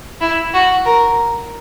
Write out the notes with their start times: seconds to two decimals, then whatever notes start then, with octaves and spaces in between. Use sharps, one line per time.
0.21 E4
0.54 F#4
0.85 A#4